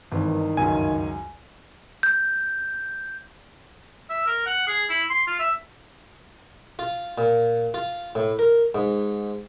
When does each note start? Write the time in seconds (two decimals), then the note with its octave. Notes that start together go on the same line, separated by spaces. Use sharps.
0.12 G#1 G2 D#3 E3
0.57 C#2 F#2 G#5
2.03 G6
4.10 E5
4.26 A#4
4.46 F#5
4.67 G#4
4.90 E4
5.10 C6
5.27 F4
5.39 E5
6.79 F4
7.18 A#2
7.74 F4
8.15 A2
8.39 A#4
8.75 G#2